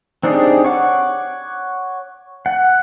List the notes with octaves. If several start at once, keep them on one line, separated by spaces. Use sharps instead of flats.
C4 D4 D#4 G4 G#4
C#5 F#5 D6
F#5